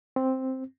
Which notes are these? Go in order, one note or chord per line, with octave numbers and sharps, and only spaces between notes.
C4